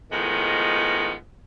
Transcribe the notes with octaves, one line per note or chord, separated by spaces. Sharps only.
A2 D#3 F3 G#3 B3